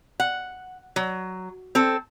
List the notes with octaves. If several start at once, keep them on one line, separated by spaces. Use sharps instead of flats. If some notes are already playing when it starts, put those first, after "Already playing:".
F#5
F#3
C4 A4